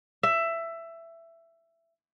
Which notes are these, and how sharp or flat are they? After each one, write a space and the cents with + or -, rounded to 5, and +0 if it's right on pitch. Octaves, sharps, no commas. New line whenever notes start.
E5 +15